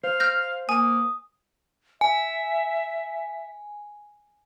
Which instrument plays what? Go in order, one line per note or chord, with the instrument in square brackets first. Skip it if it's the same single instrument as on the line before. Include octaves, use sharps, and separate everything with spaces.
[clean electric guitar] C5 [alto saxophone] F5
[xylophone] F6 G6 A#6
[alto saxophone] A#3 [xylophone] G#5 [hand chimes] D#6
[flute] E5 [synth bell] G#5